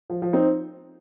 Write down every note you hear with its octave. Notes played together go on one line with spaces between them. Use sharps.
F3
F3
C4 D#4